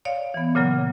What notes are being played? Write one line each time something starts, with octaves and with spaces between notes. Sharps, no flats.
C#5 D5 F5
E3 B3
A#2 C#3 F#3 A#3